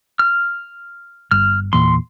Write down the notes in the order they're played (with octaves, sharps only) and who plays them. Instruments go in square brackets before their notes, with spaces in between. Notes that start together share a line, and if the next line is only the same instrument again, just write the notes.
[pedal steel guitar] F6
[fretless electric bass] G1 [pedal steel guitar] F6
[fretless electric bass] E2 A#2 [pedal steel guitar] C6